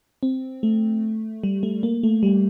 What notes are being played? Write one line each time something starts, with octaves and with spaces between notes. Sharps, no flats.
C4
A3
G3
A3
A#3
A3
G3